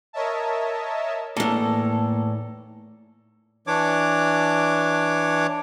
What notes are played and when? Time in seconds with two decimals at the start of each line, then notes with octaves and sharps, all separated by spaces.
0.13 A#4 C#5 D#5 E5 A5
1.37 E2 A2 A#3 A4
3.67 E3 D4 C#5 D6